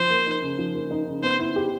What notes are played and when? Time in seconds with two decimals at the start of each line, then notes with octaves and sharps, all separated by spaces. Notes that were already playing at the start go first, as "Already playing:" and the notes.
Already playing: F3 C5
0.10 A#3
0.26 D#4
0.42 C#3
0.59 F3
0.75 A#3
0.91 D#4
1.07 C#3
1.23 B3 C5
1.40 E4
1.56 G4